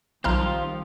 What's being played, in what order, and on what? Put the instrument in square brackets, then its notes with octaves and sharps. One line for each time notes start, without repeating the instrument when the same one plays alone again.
[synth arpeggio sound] B1 A#5 F6 [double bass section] D#3 F3 G3 [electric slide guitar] C4 F4